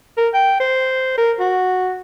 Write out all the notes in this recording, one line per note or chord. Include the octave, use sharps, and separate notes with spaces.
A#4
G5
C5
A#4
F#4